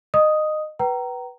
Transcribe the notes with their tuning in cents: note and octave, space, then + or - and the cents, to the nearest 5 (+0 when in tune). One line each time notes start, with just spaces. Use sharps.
D#5 -20 D#6 +5
B4 -10 G5 -40 A#5 +0